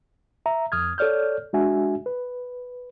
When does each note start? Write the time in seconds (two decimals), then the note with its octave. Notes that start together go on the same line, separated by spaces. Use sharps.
0.46 E5 A#5
0.72 F2 D#6 F6 G#6
0.98 A4 C#5 D5 F6 G6
1.53 G#3 D4 F#4 E5 G#5
2.06 B4